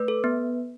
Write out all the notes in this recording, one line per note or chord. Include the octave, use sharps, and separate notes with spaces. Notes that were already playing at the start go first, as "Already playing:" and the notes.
Already playing: A3 B4
A4
B3